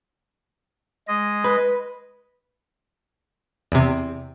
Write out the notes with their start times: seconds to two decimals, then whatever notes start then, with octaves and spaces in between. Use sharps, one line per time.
1.08 G#3 D#5
1.44 B4
3.72 E2 C3